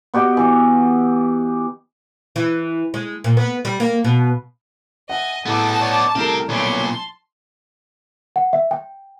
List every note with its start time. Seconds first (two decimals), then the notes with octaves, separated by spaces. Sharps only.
0.14 B3 F#4 G4 D#5
0.37 E3
2.36 E3
2.94 G#3
3.24 A#2
3.37 B3
3.65 G3
3.80 A#3
4.04 B2
5.09 D#5 E5 F#5 G#5
5.46 A2 B3 D#4 G#4 A4 A5 D6
5.80 C#5 D5
6.16 C2 A3 C4 G4 G#4 A#4 E7
6.49 B1 A#2 C#5 D5 A5 B5 C6
8.36 F#5
8.53 E5
8.71 G5